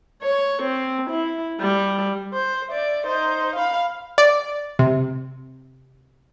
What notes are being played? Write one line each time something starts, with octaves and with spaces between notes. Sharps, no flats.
C#5
C4
E4
G3
C5
D5 E5
D#4 C5
F5 B5
D5
C3